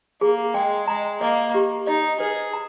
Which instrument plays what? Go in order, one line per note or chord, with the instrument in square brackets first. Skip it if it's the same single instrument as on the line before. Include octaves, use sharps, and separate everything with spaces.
[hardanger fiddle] A#3 [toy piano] G#4
[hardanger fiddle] G#3 [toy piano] G5
[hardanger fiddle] G#3 [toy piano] A#5
[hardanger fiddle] A#3 [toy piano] D#5
[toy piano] G4
[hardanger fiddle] D#4 [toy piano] D#5
[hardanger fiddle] G#4 [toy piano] B4
[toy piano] A#5